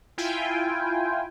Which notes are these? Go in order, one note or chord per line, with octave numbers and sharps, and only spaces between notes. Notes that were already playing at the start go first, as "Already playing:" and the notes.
E4 F4 G5 G#5